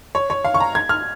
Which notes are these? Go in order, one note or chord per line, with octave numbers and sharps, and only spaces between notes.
C#5
C#5
F5
C#6
A#5
G#6
F6